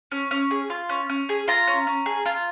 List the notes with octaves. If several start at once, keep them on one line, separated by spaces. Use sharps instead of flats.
C#4
C#4
G#4
F4
C#4
C#4
G#4
F4 A#5
C#4
C#4
G#4
F4